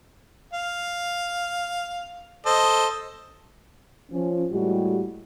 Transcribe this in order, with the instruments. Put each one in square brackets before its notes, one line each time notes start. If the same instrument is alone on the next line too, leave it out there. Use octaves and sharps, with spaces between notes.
[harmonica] F5
A4 C5 D#5
[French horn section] F3 C#4
A2 G3 G#3 F#4 G4